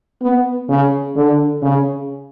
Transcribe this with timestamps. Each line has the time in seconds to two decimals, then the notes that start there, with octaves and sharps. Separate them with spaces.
0.22 B3
0.69 C#3
1.16 D3
1.62 C#3